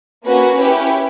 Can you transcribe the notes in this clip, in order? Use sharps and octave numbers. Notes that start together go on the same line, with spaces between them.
A#3 C#4 F#4 B4
C#4 E4 G4 B4